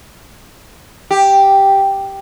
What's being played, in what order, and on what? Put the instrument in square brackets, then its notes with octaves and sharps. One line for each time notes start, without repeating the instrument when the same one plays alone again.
[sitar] G4